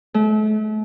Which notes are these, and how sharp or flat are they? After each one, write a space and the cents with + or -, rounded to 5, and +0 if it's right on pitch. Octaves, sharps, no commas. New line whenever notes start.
A3 -40